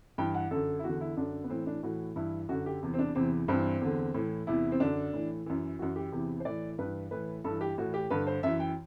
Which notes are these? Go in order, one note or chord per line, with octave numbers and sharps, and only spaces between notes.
G2 E3 G5
F#5
F#2 D3 A4
E4
E2 D3 F#4
E4
F#2 D3 D4
B3
A2 E3 C4
D4
A2 E3 F#4
G2 E3 E4
F#2 D3 F#4
G4
E2 C3 E3
C4
D4
E2 C3 E3 C4
G2 E3 C4
E2 D3
A2 E3
E2 C3 E3 E4
C4
F#2 D3 D4
A2 E3
F#2 E3
F#2 E3 F#4
G4
E2 C3 E3
C5
A2 E3 D5
G2 E3 B4
A2 E3 B4
G2 E3 A4
G4
A2 E3 F#4
G4
G2 D3 B4
C5
F#2 E3 E5
G5